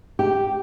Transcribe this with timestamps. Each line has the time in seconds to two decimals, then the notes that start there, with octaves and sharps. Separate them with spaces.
0.19 G4